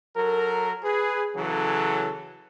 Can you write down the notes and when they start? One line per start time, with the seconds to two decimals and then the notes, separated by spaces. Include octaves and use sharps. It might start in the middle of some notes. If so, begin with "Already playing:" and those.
0.16 F#3 A4 A#4
0.84 G#4 B4
1.36 C#3 E3 F#3 A4